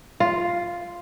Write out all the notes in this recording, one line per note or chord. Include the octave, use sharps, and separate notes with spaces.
F4